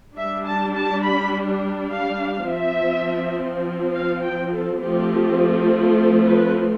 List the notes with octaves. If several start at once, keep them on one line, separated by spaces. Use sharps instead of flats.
G3 D4 E5
A5
A5
B5
F5
F3 C4 E5
F5
G5
A4
F3 A3 C4 G4
A4
B4